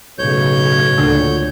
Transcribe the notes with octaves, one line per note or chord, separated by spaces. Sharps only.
B1 A2 C#3 C#5 G6
D2 A#2 D3